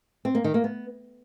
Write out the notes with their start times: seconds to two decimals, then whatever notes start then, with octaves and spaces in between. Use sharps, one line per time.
0.25 C4
0.35 A#3
0.44 D#3
0.54 A#3
0.64 B3